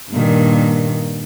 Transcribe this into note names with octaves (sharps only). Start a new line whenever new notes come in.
G2 A#2 D#3